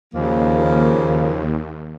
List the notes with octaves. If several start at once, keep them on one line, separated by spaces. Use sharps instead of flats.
D#2 C#3 F3 A#3